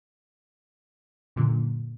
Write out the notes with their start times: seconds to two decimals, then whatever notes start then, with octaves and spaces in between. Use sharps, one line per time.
1.36 F#2 A#2 D3